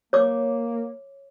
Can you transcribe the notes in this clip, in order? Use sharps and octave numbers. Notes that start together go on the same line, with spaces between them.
A#3 C#5 D6